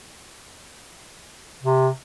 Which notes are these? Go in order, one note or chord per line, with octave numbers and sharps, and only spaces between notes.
C3